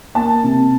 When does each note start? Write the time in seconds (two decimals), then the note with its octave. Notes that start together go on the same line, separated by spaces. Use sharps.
0.15 A#3 A5
0.44 C3